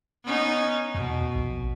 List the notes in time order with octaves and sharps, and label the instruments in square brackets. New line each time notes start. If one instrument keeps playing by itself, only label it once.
[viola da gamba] B3 C#4 D#4
[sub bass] E2 [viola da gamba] B2
[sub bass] A#1